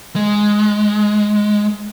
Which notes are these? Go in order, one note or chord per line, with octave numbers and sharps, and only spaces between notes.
G#3